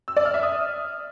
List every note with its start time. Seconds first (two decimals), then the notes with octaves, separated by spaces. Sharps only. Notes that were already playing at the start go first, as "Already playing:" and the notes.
0.08 E6
0.17 D5
0.25 F6
0.34 E5
0.43 D#6